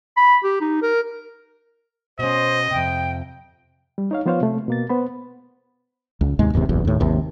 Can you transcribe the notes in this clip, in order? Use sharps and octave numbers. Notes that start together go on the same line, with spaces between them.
B5
G4
D#4
A#4
B2 C#4 C5 D#5
F2 C3 G5
G3
D#4 C#5 F5
F3 B3 F4 C5 C#5 F5
C3 A3
B2 A#3 A6
B3 C5 B5
C#2
D#2 G#2 C3 G#3
D#1 D#2 G#2 C3
F#1 B1 E2
D#2 A2
G#1 D#2 C3